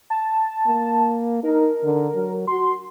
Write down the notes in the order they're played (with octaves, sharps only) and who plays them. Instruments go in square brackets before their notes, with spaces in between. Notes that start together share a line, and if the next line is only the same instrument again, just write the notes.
[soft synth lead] A5
[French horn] A#3
[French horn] D#4 [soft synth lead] A#4
[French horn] D3
F#3
[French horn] F#4 [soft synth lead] C6